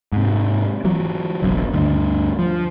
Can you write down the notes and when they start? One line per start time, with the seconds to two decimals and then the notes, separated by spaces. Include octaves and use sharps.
0.12 G#2 C3
0.84 E3 F#3
1.42 F#1 B1 F#2
1.74 D2 G2 D3
2.39 F3